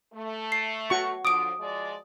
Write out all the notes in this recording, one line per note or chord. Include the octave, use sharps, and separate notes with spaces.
A3
C7
F#4 C#6
D3 F3 D6 D#6 D7
F3 G#3 D5